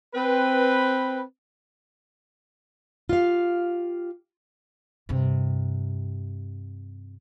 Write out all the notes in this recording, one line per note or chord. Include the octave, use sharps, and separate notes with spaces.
C4 B4
F4 G4 F5
G2 C3